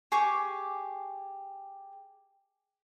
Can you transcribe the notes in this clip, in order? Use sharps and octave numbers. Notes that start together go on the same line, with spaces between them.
G4 G#4 C#6 D6